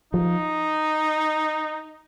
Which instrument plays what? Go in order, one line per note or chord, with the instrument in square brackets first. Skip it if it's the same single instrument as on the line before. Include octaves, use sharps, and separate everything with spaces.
[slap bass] F3 [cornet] D#4